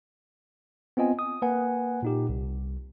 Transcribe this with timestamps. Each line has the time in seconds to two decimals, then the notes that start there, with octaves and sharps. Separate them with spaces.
0.97 B3 C4 F4 D#5 G#5
1.19 D#6
1.42 A#3 B4 F#5 G#5
2.03 A#2 D#4 G4
2.29 C2